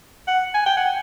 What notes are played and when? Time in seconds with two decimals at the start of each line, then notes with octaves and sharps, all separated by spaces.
0.28 F#5
0.54 G#5
0.66 G5
0.77 F#5